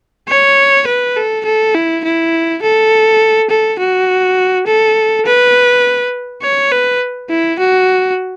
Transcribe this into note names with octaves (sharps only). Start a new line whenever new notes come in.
C#5
B4
A4
A4
E4
E4
A4
A4
F#4
A4
B4
C#5
B4
E4
F#4